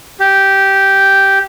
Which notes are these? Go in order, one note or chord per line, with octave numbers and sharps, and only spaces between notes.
G4